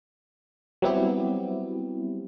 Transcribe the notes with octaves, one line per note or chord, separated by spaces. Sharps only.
F#3 G3 B3 C4 E4 G4